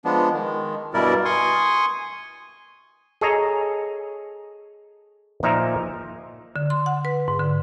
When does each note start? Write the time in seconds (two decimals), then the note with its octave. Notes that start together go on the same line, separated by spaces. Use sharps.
0.05 F3 G#3 B3 D4
0.33 D#3 G#3
0.94 G2 B2 G3 E4 A#4 D5
1.25 G#5 C6 C#6 D#6
3.21 G#4 A4 C#5 D#5 G#5 A#5
5.43 A#2 F3 D#4 D5 E5 A#5
6.56 D3
6.70 C6
6.86 F#5
7.05 B4
7.28 G#2
7.40 D3